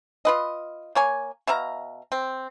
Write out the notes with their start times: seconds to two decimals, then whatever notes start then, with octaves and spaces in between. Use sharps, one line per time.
0.25 F4 B4 D#5
0.95 A#3 C#5 G#5
1.47 B2 E5 F5 A#5
2.12 C4